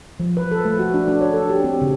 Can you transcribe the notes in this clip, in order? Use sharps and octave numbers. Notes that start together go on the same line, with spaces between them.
F3
B4
A4
A3
F#4
D4
D4
C#5
A4
G4
C4
C#3